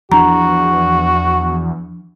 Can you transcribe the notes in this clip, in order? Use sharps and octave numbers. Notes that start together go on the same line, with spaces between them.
E2 F3 D4 F#4 A#5